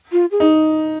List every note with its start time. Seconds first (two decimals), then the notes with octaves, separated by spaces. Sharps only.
0.12 F4
0.31 G#4
0.40 D#4